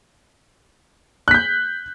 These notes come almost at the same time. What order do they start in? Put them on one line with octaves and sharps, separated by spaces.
F#6 B6 G6